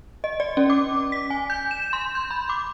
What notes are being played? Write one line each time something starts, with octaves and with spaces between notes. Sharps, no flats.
D#5
D5
C#4
D6
B6
G#5
G6
E7
C6
G6
B5
D6